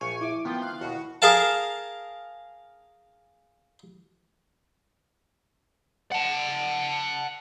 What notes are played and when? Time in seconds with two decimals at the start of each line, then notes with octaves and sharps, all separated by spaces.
0.01 A#1 F5 G5 G#5 C#6
0.21 E4 D6
0.45 D#3 F3 B3 F4 G5
0.62 F5 F#6
0.81 D#2 B2 F#4
1.22 G#4 A#4 F5 A5
6.12 F#5 A5